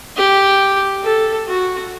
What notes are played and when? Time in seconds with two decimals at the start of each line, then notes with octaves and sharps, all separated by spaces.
0.17 G4
1.03 A4
1.47 F#4